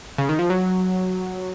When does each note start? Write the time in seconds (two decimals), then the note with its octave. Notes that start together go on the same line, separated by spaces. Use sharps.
0.18 C#3
0.29 D#3
0.39 F3
0.50 F#3